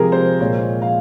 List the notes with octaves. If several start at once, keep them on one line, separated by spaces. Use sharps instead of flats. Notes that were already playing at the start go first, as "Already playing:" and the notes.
Already playing: C3 F3 G#3 G#4 A#4
C5
A#2 G#3 C#5
F5